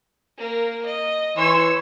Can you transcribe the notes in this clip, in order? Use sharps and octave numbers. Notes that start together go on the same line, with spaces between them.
A#3 A#4
D#5
E3 C#5 C6 E6